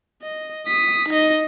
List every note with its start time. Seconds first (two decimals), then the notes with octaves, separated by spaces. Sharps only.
0.22 D#5
0.67 D#6 B6
1.09 D#4 D#5